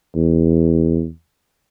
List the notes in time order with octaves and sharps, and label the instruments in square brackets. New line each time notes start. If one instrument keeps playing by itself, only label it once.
[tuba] E2